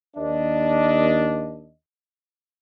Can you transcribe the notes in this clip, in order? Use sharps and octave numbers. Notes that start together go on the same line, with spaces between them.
D#2 D4 D#5